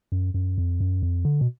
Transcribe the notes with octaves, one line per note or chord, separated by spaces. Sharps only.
F#2
F#2
F2
F#2
F2
D3
B2